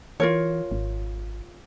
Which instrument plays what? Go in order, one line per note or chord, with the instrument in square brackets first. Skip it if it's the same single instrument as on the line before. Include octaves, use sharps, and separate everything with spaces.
[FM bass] E3 [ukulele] F4 A#4 C#5
[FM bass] G#1